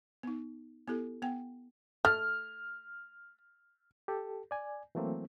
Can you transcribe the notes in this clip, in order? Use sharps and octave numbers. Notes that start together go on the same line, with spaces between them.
B3 D#4
B3 E4 G4 A4
B3 F#5 G5
A3 F6
G4 A4
D5 G#5
E3 F#3 A3 A#3 C4